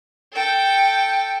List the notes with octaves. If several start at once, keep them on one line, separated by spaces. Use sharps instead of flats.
A4 G5